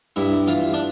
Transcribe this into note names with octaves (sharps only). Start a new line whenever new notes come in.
G2 E4
E3 F4
D4